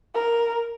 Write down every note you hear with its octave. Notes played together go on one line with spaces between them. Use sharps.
A#4